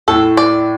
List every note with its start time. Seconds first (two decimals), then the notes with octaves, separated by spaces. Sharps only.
0.08 A2 A4
0.37 D5